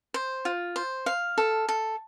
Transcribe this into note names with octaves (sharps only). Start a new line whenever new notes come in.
C5
F4
C5
F5
A4
A4